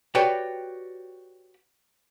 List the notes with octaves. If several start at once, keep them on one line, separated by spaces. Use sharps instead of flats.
F#4 G4 B4 C#5 D5 G5